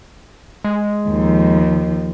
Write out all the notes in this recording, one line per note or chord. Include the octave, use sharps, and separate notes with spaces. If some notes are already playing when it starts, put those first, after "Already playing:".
G#3
D#2 F3